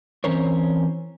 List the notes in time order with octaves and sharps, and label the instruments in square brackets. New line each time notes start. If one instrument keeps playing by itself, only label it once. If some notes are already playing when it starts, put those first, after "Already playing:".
[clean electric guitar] E3 C4 C#4 A#4 C5 C#5